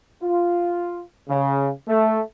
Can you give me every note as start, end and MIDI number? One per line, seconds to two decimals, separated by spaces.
0.23 1.00 65
1.28 1.70 49
1.88 2.21 57